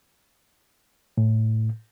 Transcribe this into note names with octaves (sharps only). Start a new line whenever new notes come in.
A2